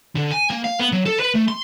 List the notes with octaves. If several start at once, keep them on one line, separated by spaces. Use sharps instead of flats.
D3
G#5
A#3
F5
B3
F#3
A4
B4
A3
C6